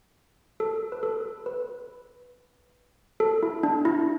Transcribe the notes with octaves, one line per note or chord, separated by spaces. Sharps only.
A4
B4
A4
B4
A4
E4
D4
E4